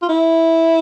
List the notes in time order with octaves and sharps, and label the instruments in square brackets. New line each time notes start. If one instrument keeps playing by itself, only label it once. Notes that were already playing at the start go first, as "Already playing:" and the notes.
[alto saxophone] F4
E4